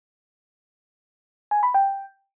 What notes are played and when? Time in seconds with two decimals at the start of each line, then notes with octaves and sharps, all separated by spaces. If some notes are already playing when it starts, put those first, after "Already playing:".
1.51 G#5
1.63 B5
1.74 G5